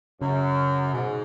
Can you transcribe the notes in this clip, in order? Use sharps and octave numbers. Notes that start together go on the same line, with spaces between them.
F#2 C#3
G#2 B2